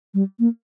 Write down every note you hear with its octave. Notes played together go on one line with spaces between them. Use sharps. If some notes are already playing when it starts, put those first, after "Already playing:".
G3
A#3